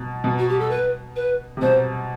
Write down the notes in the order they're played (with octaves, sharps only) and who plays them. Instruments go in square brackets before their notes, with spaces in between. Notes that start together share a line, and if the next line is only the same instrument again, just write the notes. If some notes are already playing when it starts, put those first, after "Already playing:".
Already playing: [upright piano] B2
B2
[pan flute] F#4
G4
A4
B4
B4
[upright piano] C3
[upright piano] B2 [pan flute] C5